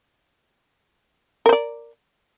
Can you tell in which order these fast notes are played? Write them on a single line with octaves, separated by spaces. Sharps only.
A#4 C5 D5